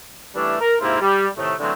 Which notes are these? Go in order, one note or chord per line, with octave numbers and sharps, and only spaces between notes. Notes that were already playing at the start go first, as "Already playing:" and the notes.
E3 G3 A3 C#4 D4
A#4
G#2 C3 A#3 C4 E4 F4
G3
A2 C3 D#3 A3
D3 E3 F#3 G#3 A3 C4